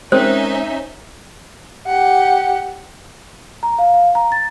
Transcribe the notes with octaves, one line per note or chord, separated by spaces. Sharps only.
G#3 C4 C#4 D#4 A#4 C5 E5
G4 F#5
A#5
F5
F5
A#5
A6